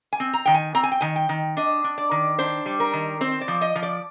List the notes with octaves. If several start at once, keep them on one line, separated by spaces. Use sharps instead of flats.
G#5
C4
A#5
D#3 G5
G#5
C4 A#5
G#5
G5
D#3 G#5
G5
D#3
D4 D#5
D4
D5
D#3
D4 C5
G3
A#4
D#3
C4 C5
D5
F3
D#5
F3
D5